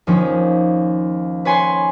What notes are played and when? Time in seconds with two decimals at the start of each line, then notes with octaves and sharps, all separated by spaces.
0.07 D#2 F3 C#4
1.45 B4 C#5 G#5 C6